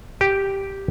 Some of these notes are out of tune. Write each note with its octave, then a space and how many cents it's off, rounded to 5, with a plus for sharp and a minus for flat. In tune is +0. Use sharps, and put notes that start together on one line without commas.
G4 -5